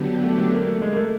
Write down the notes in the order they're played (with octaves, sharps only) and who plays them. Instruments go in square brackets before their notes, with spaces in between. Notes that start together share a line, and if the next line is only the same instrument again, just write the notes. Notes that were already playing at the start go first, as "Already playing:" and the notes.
Already playing: [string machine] D3 F#3 B3 D4 G4
[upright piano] A3
A3
A#3
A3
G#3
A#3
A3